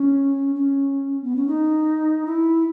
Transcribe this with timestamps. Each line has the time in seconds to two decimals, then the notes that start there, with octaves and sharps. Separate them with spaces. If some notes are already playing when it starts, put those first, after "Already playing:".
Already playing: C#4
0.55 C#4
1.24 B3
1.36 C#4
1.47 D#4
2.26 E4